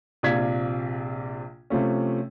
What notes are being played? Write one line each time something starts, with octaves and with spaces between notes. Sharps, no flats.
A#1 C3 F4 D5 G#6 B6
C3 F3 A3 C#4